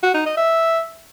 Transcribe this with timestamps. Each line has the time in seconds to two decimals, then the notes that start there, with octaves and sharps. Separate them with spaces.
0.03 F#4
0.14 D#4
0.26 D#5
0.37 E5